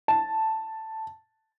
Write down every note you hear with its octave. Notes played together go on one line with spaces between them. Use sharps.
A5